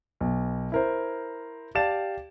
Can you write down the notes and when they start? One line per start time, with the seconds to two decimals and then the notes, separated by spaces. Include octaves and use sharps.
0.21 B1
0.72 E4 A#4 C5
1.75 G4 D5 F5 A5 A6 E7